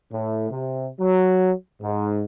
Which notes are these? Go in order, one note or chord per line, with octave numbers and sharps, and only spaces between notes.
A2
C3
F#3
G#2